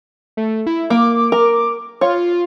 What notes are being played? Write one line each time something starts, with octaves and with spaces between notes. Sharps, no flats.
A3
E4
A#3 D6
A#4
F4 C#5